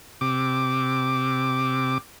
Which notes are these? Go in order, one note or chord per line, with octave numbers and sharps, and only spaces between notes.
C3 D6